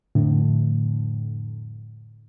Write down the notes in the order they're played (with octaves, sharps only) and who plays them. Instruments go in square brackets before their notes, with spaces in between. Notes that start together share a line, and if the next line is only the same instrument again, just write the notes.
[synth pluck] F2 A2 D3